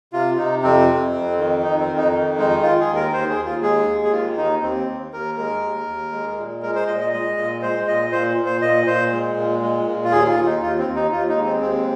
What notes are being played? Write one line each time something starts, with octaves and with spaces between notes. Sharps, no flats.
C3 F4
C3 D#4
F2 C4
F2
F2
D#3
F2 D#4
C4
F2
D#4
D#3
G#3 D#4
D#3 F4
G#4
D#2
A#4
D#2 C5
G#4
D#2
F4
G#3 G#4
D#2
G#4
D#3 F4
D#2 D#4
D#2 C4
D#2
D#2 A#4
G#3 A#4
D#2
D#2
G#3
A#2
G#3 A#4
C5
A#2 D#5
D#5
G#3 D#5
A#2
G#3 C5
A#2 D#5
A#2 C5
A#2
C5
A#2 D#5
A#2 C5
G#3
A#2
G#3
A#2
F4
D#2 G#4
F4
D#2
D#4
D#2 F4
C4
D#2
D#4
D#2 F4
D#4
G#3
C4
D#2 C4